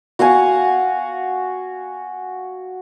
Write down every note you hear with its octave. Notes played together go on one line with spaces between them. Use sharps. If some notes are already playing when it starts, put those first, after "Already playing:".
F#4 F5 F#5 G#5